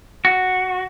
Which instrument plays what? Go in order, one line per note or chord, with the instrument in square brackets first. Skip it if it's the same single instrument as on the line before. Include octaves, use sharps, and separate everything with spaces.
[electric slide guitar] F#4